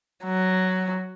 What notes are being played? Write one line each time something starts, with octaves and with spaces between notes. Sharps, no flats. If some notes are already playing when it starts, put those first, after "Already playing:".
F#3